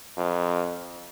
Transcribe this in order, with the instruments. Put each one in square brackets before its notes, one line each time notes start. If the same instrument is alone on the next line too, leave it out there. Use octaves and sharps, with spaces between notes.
[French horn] F2